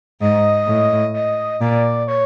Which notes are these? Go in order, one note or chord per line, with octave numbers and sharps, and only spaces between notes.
G#2 D#5
A2
D#5
A#2 D5
C#5